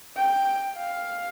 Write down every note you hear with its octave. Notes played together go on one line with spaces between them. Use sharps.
G5
F5